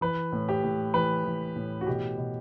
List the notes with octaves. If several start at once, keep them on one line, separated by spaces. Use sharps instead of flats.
E3 B4
A2
G4
A2
E3 B4
E3
A2
F#4
B2 G4
B2